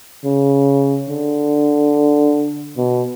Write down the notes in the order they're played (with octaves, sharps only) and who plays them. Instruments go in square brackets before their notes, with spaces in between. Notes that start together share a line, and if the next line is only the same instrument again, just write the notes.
[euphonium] C#3
D3
B2